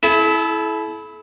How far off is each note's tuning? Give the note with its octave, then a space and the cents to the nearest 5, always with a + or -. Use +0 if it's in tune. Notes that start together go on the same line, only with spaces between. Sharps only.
E4 +0 A4 -40